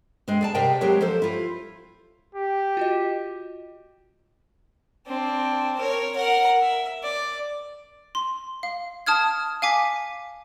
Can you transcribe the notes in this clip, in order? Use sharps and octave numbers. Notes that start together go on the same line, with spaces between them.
G#3 C4
G#4 D5 A5
C3 G#4 A#4 D5 D#5 G5
F#3 G#3 C4 G4 A#4 C#5
F3 A4 C5
E4 F4
G4
F4 F#4 D#5
C4 D4
A#4 C#5
A#4 F#5
E5
D5
C6
F5
A5 D#6 F6 G#6
F5 G#5 D6 B6